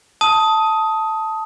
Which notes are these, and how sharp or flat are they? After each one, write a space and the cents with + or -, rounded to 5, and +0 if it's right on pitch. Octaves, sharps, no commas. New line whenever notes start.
A5 +0 D#6 +15